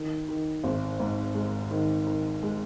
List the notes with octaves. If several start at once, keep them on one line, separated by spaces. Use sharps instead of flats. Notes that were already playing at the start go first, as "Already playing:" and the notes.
Already playing: D#3
D#3
G#1
G#2
G#3
D#3
D#3
G#3